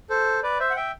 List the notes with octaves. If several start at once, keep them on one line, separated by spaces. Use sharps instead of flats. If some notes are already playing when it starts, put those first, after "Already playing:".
A4 C5
B4 D5
C5 E5
F#5
E5 G5